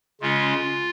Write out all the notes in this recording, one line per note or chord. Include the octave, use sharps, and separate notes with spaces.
C#3 G#3 C#4 F4